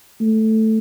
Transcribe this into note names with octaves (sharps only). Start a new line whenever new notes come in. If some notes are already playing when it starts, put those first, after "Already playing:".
A3